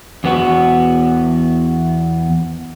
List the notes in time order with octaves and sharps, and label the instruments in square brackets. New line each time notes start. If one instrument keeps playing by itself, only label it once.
[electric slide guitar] E2 B3 F#4